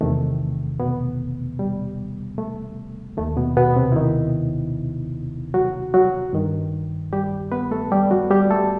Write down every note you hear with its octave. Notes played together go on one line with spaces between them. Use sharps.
E2 C3 D#3 A3
B2 B3
G3
A3
D#2 D#3 A3
B2 B3
B2 B3
C3 C4
E4
D#3 D#4
F#3 F#4
F#3 F#4
G2 D#3
G3 G4
B3 B4
A3 A4
G3 G4
F#3 F#4
G3 G4
A3 A4